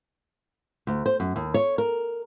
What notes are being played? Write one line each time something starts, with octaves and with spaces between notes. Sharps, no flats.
D2
C5
F#2
D#2
C#5
A#4